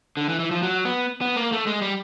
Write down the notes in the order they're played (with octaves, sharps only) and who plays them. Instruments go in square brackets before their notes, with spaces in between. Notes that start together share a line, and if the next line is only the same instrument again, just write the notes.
[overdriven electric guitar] D3
E3
E3
F3
F#3
B3
B3
A#3
A3
G#3
G3